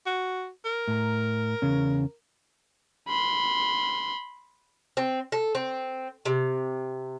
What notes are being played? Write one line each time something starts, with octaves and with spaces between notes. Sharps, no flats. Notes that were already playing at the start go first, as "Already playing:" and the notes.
F#4
A#4
A2 A#5
E2 C#3 C#4
B5 C6
C4
A4
C4
C3